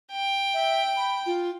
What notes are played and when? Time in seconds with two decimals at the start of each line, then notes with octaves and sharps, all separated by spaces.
0.12 G5
0.54 E5
0.97 B5
1.26 F4